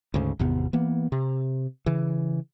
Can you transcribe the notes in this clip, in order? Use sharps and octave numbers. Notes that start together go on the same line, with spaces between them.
D2 G#2 C#3
G#1 E2 C3 B3
E3 A#3 B3
C3
C#3 E3